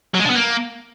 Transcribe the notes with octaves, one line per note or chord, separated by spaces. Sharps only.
F#3
G#3
D4
B3
A#3